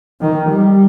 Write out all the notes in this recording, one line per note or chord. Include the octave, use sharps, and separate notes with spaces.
D#3
G3